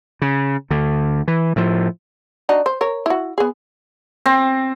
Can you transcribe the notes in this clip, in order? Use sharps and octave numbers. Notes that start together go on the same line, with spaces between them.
C#3
D2 D3
E3
A2 F3
D4 D#4 F#4
C5
A#4 C#5
E4 F#4
B3 G#4
C4